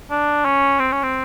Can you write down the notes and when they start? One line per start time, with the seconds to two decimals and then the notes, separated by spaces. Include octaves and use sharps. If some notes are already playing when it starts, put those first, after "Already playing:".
0.11 D4
0.45 C#4
0.79 C4
0.92 C#4
1.03 C4